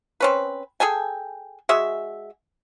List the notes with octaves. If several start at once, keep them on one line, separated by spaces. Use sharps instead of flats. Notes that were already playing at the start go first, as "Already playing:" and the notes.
C4 C#4 B4
G#4 A4 G5 G#5
G#3 F#4 G#4 E5